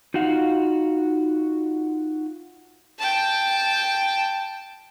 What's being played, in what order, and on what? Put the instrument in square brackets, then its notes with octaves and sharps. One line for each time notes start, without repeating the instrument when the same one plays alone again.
[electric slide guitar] D#4 F4 F#4 F5
[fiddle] G5 A5